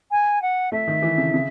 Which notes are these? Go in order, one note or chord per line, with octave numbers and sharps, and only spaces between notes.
G#5
F#5
A3 E5
D#3
E3
C#3
C#3